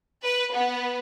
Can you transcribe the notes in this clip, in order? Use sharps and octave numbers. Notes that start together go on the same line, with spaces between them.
B4
B3